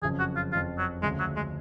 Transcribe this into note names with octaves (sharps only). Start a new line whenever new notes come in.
F#1 F2 C#3 F3 G#4
F#4
F4
F#1 F2 C#3 F3 F4
F#3
D2 C#3 F3 G#3
F#3
G#3